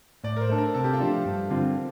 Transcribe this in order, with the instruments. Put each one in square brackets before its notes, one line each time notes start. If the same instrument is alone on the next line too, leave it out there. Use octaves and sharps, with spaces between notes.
[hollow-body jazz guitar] A2 [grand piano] D5
[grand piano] A#4
C5
[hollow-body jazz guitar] A3 D4 [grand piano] A4
[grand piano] A#4
[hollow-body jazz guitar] C3 [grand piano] A4
[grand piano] G4
F4
[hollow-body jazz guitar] F3 A3 D4 A4 [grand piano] G4
[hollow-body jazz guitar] G2
D3 G3 C4 F4